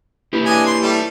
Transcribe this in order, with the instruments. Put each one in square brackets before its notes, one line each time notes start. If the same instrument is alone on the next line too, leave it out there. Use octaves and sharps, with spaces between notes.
[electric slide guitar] E4 G4 B4
[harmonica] D4 D#5 G#5
C6
G3 A3